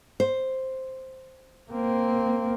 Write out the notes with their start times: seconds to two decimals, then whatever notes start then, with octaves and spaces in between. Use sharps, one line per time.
0.20 C5
1.71 A#3 C4